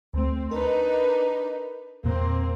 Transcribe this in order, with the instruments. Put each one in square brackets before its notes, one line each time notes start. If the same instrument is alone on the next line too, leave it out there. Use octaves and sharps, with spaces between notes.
[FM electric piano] D2 A3 [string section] C4
[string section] D4 D#4 B4 [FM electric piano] A#4
[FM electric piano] E2 A#2 [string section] A#3 C4